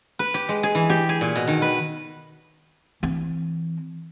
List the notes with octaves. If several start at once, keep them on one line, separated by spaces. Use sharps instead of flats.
B4
G4
G#3
G#4
E3
G4
G#4
A#2
B2
D#3
B4
E3 C4